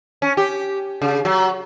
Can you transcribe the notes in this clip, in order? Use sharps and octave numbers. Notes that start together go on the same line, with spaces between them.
C#4
G4
C#3
F#3